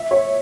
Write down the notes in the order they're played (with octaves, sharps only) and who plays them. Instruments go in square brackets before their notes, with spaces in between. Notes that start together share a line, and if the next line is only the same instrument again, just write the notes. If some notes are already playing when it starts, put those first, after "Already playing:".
Already playing: [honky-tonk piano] E5
C#5